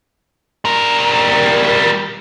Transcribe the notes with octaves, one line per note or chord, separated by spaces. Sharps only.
G3 A#4